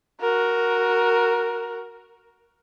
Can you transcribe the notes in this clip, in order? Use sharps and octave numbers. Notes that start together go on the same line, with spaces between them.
F#4 A#4